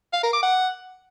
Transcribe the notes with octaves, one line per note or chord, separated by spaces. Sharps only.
F5
A#4
D6
F#5